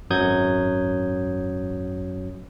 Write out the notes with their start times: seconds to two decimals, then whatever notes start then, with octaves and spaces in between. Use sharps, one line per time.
0.10 G#1 F#2 F#3 D#6 G6 G#6